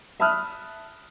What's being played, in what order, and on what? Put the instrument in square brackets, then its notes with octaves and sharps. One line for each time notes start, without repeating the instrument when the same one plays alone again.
[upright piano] E5 A5 B5 D#6 F6 F#6